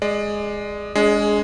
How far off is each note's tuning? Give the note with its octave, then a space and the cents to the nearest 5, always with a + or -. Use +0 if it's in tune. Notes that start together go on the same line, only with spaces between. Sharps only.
G#3 +0 D5 +25
G#3 +0 D4 -35 G#4 +15